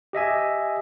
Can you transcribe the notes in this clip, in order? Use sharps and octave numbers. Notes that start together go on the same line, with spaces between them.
G4 D#5 E5 G#5